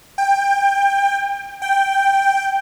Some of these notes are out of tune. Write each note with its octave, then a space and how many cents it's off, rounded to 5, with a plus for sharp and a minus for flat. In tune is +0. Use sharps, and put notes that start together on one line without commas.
G5 +20
G5 +0